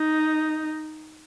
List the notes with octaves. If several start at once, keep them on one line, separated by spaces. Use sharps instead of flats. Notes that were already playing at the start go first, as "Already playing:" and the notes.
Already playing: D#4